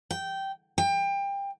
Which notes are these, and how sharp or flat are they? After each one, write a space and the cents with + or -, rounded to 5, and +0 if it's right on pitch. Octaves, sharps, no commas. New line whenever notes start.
G5 -10
G5 +25